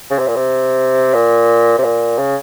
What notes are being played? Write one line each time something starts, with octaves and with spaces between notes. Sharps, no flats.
C#3
C3
A#2
C3
A#2
C3
A#2
C#3